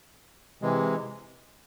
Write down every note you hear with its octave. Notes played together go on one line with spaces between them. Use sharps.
C3 E3 G#3